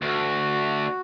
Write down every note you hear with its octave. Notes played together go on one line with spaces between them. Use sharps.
D2 F#4